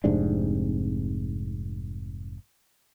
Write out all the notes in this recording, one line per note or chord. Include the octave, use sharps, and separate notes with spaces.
F1 G#2 C3 D4